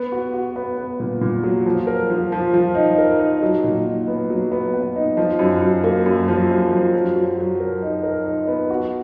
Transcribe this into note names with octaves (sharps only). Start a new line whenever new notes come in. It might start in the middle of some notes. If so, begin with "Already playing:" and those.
Already playing: B3
F#4
F#4
B3
B3
A#2
A#2
F#3
F3
A#4
F3
F3
F3
D#4
A#4
D#4
F#3
A#2
D#4
B3
F#3
B3
B3
D#4
F3
F#2
F#2
A#3
F#2
F3
F#2
F3
F#3
F#3
F#3
A#4
D#4
A#4
D#4
B3
F#4